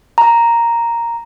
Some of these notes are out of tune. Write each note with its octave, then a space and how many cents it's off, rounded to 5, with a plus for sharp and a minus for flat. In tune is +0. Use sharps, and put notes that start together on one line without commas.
A#5 +0